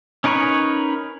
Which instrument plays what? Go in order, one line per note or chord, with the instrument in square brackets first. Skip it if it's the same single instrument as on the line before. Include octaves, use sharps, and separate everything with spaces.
[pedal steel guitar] C#4 D#4 A#4 B4 C#5